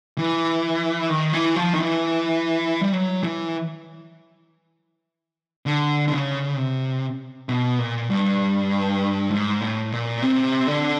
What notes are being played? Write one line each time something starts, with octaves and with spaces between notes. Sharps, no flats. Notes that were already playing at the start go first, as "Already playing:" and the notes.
E3
D#3
E3
F3
D#3
E3
G3
F#3
E3
D3
D3
C#3
C3
B2
A#2
G2
G#2
A2
A#2
C3
D3